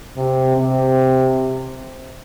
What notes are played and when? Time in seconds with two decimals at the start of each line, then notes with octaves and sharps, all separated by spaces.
0.17 C3
0.57 C3